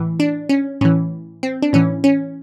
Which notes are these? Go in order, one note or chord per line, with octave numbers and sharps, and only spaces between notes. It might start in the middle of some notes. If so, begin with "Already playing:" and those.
Already playing: A2 E3
D4
C#4
A2 E3 C#4
C4
D4
A2 E3 C#4
C#4